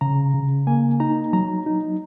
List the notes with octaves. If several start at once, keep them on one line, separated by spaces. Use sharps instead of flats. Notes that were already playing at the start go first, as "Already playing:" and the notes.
C#3 A#5
C#3
A#3 G#5
D#4 A#5
F#3 A#5
D#4